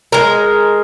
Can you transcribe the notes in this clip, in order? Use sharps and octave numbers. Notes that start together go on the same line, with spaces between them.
G#3 A#4